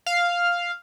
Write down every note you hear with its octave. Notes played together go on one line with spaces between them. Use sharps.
F5